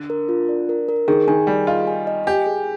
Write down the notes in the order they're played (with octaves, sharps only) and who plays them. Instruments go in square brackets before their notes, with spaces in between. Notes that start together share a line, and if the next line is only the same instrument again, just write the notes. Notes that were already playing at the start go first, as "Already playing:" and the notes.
Already playing: [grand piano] D3
[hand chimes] A#4
F4
D5
A#4
A#4
[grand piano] D#3 [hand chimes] G#4
[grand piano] D#3 [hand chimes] G#5
[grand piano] G3 [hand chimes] G#4
[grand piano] F4 [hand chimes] D#5
[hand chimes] G#5
D#5
[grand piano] G4 [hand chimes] G#5
[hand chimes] G#4